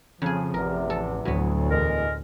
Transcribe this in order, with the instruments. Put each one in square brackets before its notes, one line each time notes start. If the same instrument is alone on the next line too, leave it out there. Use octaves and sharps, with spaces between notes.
[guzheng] F2 G#4 [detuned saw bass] C#3 [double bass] F3
[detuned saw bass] A1 [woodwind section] E2 C3 [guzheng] A#4
[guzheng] A4
[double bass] D2 [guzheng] A2 B3 [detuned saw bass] F#3
[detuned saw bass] E2 [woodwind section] G#3 A#4